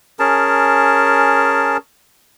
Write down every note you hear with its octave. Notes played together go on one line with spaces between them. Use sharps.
C#4 G#4 A#4 A5